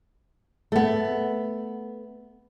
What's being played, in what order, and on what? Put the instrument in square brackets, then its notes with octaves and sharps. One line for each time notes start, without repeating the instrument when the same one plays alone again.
[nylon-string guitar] A3 B3